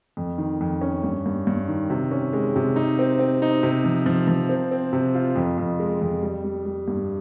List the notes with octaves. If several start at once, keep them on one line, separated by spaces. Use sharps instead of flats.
F2
D#3
F2
C#4
G2
G2
G2
D#3
C3
C#4
G#3
C3
D#4
C4
C4
D#4
C3
F3
F3
F3
C4
C4
C3
F4
F2
F2
G#3
F2
G3
G3
G3
G2